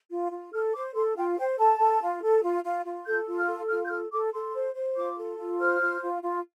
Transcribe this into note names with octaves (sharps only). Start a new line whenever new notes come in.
F4
F4
A4 F6
C5 D6
A4 C6
F4 G5
C5 G5
A4 A5
A4
F4
A4
F4
F4
F4
A4 G6
F4
F6
A4
F4 F6
G6
A4 F6
A4 D6
A4 C6
C5
C5
F4 D6
A4
F4
C5 F6
F4
F4
F4